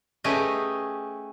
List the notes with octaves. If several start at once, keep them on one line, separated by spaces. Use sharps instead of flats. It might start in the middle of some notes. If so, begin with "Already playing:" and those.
A3 C#4 G4 G#4 B4 D#5